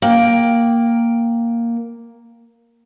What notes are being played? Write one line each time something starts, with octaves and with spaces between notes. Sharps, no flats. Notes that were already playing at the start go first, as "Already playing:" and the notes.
A#3 G5